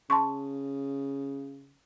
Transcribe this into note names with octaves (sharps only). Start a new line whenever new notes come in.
C#3 A5 C6 C#6